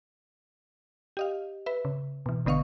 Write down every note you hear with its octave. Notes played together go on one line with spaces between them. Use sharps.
G4 D#5 F5
B4 E5
C#3
B2 E3
G#1 D3 B3 D#5 F5 C#6